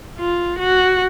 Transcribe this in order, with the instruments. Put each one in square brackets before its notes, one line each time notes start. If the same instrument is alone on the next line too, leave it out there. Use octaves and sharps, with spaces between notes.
[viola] F4
F#4